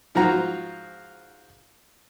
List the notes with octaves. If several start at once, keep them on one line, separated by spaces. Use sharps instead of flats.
G#2 F3 F4 F#4 A#5